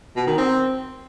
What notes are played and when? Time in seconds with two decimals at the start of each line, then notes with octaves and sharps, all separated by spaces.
0.16 B2
0.27 D#3
0.38 C4